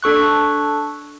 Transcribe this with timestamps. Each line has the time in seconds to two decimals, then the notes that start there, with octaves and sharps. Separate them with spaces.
0.03 D4 A4 C#6 F#6